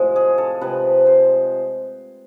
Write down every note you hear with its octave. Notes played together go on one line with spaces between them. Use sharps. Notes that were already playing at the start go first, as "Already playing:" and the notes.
Already playing: A2 C3 F3 G#3
G#4
A4
C3 F3 G#3 B4
C5